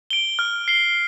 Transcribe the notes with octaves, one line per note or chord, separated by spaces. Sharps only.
D7 G7
F6
C7 G7